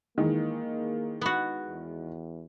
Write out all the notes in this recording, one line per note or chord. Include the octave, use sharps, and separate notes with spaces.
D#3 E3 G#3 A#3
B3 F#4
E2